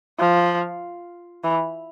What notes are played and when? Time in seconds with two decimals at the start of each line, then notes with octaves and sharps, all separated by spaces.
0.19 F3
1.44 E3